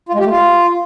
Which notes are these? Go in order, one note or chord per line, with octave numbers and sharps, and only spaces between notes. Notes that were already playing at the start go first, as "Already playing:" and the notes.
F4
G#3
G4
A3
F4